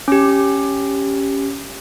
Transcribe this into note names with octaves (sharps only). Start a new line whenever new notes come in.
C#4 G4